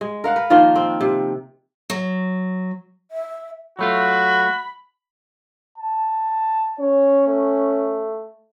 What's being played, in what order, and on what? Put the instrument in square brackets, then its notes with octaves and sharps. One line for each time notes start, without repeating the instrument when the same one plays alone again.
[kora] G#3
A#4 F5 F#5
B4
D#3 F3 A#3 F4
C4
C3
[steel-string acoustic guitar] F#3
[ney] E5
[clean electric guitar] F#3 A3 F4 [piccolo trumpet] F#4 [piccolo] B5
[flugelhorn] A5
[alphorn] C#4 [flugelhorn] C#5
[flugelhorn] A3